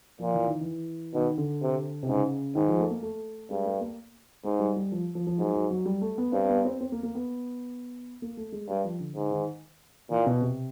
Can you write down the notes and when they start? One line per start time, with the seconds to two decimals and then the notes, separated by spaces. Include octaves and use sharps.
0.19 A#2 F3
0.34 E3
0.47 D#3
0.61 E3
1.14 B2 D#3
1.38 D3
1.62 C3
2.03 C3
2.08 G#2 C#3
2.55 G#2 D#3
2.68 F3
2.79 A3
2.91 A#3
3.03 A3
3.51 G2 G#3
3.66 A3
3.81 A#3
4.44 G#2 G#3
4.60 G3
4.76 G3
4.92 F3
5.15 F3
5.27 F3
5.39 G#2 F#3
5.54 F#3
5.71 F#3
5.86 G3
6.01 A3
6.18 B3
6.33 G2 C4
6.49 B3
6.65 C4
6.81 C4
6.92 A#3
7.03 A#3
7.15 B3
8.22 A#3
8.37 A3
8.52 G#3
8.68 G2 G3
8.85 F3
9.00 D3
9.15 G#2 D3
9.31 D#3
10.10 A#2 E3
10.26 B2
10.41 C3